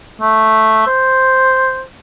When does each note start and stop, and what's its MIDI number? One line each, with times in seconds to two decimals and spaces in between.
0.21 0.85 57
0.87 1.81 72